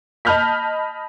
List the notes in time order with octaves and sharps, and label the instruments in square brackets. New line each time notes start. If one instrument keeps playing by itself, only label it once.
[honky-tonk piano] D#5 A5 B5 F6 G6 B6